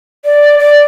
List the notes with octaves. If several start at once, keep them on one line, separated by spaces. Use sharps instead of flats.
D5
D5